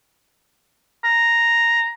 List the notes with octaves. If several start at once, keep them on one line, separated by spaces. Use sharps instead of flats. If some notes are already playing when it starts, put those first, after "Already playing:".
A#5